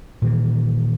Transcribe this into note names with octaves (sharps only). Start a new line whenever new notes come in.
A#2 D#3 E3